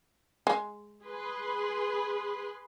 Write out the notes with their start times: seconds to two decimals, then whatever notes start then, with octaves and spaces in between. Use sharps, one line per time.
0.47 G#3
1.06 G#4 B4 C6